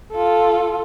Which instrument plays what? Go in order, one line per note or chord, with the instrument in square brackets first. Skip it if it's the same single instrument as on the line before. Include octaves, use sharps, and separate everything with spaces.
[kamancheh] F4 A4